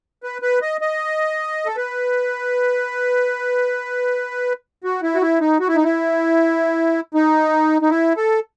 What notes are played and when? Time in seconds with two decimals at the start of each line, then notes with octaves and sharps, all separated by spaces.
0.23 B4
0.42 B4
0.62 D#5
0.81 D#5
1.66 A4
1.77 B4
4.84 F#4
5.02 E4
5.15 F#4
5.22 E4
5.41 D#4
5.60 F#4
5.68 E4
5.76 D#4
5.84 E4
7.14 D#4
7.82 D#4
7.90 E4
8.17 A4